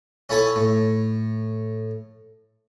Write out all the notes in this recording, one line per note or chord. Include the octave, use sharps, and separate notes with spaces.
C#4 E4 A4 C#5 G#5
A2